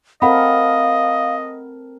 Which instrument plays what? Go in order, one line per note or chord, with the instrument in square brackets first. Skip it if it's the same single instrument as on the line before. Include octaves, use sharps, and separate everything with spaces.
[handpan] C4 A4 A#4 [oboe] D#5 [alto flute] F5 [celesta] F#5 B5